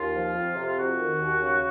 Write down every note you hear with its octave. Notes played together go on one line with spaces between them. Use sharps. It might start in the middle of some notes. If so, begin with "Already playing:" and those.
Already playing: D#2 F4
F3
F2
C3
F4
F2 F#4
D#3
D#2
C#3